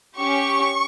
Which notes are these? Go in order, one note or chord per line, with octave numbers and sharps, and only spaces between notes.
C#4 G4 C#6